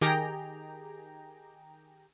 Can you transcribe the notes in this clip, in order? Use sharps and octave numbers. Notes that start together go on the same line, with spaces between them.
D#3 G4 G#4 G5 A#5